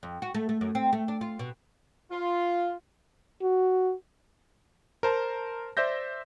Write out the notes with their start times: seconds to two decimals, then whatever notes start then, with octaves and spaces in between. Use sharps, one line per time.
0.03 F2
0.22 F#4
0.34 A3
0.49 A3
0.61 F#2
0.75 C4
0.93 A3
1.08 D4
1.21 F4
1.39 B2
2.11 F4
3.42 F#4
5.03 A#4 C5 A5 A#5
5.77 C5 D5 E5 G6 A#6